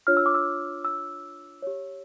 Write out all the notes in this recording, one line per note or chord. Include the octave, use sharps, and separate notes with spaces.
D4 F4 C#5 F6
E6
D6
E6
E6
G4 C#5